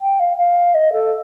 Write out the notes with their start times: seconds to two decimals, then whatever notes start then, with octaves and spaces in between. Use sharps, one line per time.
0.01 G5
0.19 F5
0.37 F5
0.74 D#5
0.92 A4